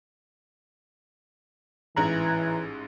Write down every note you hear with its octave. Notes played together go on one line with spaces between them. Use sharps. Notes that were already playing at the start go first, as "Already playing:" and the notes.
A1 G#2 E3 A#5 F#6 G#6